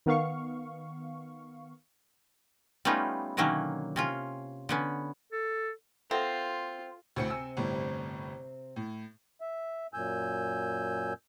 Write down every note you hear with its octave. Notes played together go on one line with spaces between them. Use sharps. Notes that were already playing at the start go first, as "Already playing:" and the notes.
D#3 B3 F5 C#6
G3 A3 B3 C#4 D#4 F4
B2 D3 D#3 F#3 A#3 C#4
C3 C#4 F4
D3 B3 C#4
A4
C4 F4 A4 E5 F#5
D2 A2 C3 C4 E5 C#7
G#5 E6
G1 A2 G3
A2
E5
F#2 A#2 G#5 E6 G6